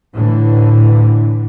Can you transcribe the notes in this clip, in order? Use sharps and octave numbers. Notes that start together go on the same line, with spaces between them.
A2 D3 E3